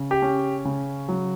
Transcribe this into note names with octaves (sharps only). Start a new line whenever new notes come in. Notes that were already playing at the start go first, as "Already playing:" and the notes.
Already playing: C#3
G4
C#4
C#3
F#3